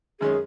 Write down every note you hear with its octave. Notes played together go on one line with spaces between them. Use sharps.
F#2 D#3 G#3 C#4 G#4